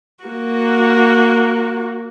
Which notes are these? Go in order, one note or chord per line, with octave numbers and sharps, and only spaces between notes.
A#3 F#4